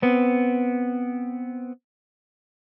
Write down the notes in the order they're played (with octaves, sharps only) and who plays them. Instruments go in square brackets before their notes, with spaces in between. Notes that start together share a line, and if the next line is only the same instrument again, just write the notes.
[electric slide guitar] B3 C4